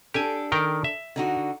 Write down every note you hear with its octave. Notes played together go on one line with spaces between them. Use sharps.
D4 G4 A4 G#5
D#3 A#4 G5
E5
D3 D#4 F#4